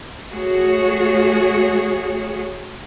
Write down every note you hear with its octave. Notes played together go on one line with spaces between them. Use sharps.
A3 F#4 G#4 C#5